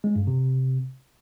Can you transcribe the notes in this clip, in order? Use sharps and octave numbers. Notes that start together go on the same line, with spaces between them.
G#3
G2
C3